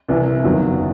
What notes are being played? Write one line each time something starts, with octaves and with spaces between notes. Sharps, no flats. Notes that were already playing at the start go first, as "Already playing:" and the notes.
C2 C3 E3
F#1 E2 D#3 F#3